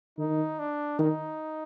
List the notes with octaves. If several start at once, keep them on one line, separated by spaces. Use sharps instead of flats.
D#3 D#4
D4
D#3 D#4